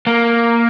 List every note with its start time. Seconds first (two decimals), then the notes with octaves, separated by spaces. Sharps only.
0.07 A#3